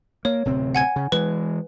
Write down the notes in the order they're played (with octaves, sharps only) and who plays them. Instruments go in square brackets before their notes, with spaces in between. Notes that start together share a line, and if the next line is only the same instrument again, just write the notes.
[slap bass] A#3 [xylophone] C#5
[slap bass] D1 C3 C4
[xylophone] F#5 G#5 G#6
[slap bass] C#3
[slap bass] E3 G#3 [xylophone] B4